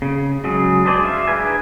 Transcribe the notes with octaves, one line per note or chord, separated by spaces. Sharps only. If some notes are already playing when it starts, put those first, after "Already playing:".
C#3
C#3 F#3 G#3 G#4
D4 G#4 C5 D5 D#5
E5 F5
D4 D#4 G#4 B4 G#5